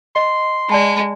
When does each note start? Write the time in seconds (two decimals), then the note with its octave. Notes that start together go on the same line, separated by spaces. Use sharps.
0.16 D#5 C6
0.69 G#3 D5 A5 B5